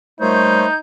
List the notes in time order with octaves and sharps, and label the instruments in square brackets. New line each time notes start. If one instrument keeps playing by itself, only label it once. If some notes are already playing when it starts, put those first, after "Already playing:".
[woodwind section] A#2 G3 A3 [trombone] D#4 [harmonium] C5 C#5 [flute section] G6